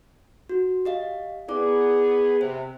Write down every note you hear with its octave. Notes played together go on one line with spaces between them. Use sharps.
F#4
G4 D#5 F5
B3 E4 G#4 D5 D6
C3 C5